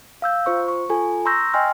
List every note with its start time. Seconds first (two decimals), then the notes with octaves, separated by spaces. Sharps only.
0.22 F5 E6 G6
0.46 F4 C5 C#6
0.68 C#6
0.89 F4 A4 G#5
1.25 A#5 C6 C#6 E6 G6 A#6
1.54 D#5 G5 G#5 C6 F6